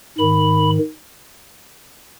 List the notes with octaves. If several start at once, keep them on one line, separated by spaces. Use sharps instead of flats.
G#2 D#3 B5